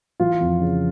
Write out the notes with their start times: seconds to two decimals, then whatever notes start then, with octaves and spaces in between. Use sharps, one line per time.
0.20 E3 F4
0.41 F2
0.60 C#3